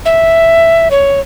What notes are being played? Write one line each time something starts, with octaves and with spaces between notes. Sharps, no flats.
E5
C#5